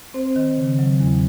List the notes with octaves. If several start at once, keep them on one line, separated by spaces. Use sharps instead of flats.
C4 C5
D#3
C#3
F#3
E2